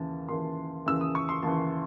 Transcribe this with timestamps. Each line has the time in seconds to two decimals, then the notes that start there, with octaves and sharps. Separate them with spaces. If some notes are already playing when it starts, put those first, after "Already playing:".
Already playing: D#2 C#3 E3 A5
0.28 D#2 C#3 E3 C6
0.86 D#2 C#3 E3 E6
1.01 D#6
1.15 C#6
1.29 C6
1.43 D#2 C#3 E3 A5